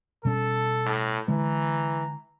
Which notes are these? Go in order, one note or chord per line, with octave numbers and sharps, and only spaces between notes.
B2 G3 C#4 A4
A2
D3 E3 G#3 A#5